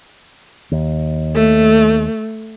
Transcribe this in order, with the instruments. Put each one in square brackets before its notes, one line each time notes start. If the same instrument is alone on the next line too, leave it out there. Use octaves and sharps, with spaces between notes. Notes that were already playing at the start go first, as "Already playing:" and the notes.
[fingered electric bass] D#2
[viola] A3